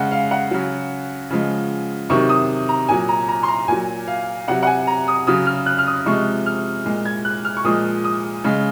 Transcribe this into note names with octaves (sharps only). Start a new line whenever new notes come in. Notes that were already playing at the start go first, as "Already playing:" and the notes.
Already playing: C#3 G#3 F#5
F5
F#5
C#3 F#3
C#3 F3 G#3
C3 D#3 F#3 C#6
D#6
A#5
A#2 F#3 G#5
A#5
A#5
C6
A#5
A#2 F#3 G#5
F5
C3 F#3 F#5
F#5
G#5
A#5
D#6
C#3 F#3 D#6
F6
F#6
F6
D#6
C3 F3 G#3 C#6
F6
A#2 G#3
G#6
F#6
F6
C#6
A#2 F3 G#3 D#6
D#6
C#3 G#3